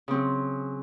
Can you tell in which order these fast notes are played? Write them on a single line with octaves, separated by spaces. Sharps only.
C#3 C4 F#3